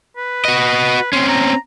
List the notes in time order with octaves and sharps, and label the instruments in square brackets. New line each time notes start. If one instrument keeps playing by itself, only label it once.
[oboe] B4
[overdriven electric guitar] F#4 D#5
[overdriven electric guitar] C4 C#4 [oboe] C6
[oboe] A#5